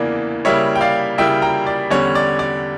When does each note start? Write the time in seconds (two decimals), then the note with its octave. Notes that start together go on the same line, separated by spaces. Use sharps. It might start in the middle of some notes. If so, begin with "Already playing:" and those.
Already playing: E2 C#3 E3 A#3 D4
0.45 C#3 G3 A#3 E4 C#5 E5
0.76 G5
0.81 D5 F5
1.18 C#3 G3 A#3 E4 E5 G5
1.42 G5 A#5
1.67 D5
1.90 E2 D3 G3 C#4 C#5
2.15 D5
2.39 D5